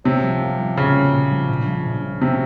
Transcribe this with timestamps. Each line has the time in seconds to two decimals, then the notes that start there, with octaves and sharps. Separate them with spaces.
0.04 C3 C#4
0.23 F3
0.41 A#3
0.59 F3
0.77 A#2 C#3
0.96 A#3
1.13 A#2
1.31 F3
1.49 A#1
1.67 F3
1.85 A#1
2.03 F3
2.22 C3